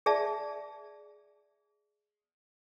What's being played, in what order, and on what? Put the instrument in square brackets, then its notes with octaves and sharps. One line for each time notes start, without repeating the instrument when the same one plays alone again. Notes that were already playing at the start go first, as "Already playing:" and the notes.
[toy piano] G#4 D5 E5 A5